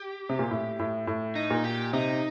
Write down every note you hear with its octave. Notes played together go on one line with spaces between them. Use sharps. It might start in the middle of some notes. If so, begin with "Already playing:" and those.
Already playing: G4
C3
A#2
A2
A2
A2
D#4
A#2
G4
C3 D#4